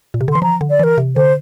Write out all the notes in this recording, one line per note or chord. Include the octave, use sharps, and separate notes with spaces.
A#2
C3
D3
E3 C6
F3 A#5
D3
D5
E3 A#4
C3
D3 C5